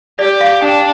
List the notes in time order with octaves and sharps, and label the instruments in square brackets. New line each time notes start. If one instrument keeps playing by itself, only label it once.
[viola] G4 [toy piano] D5
[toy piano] F5
[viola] D4 [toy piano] G5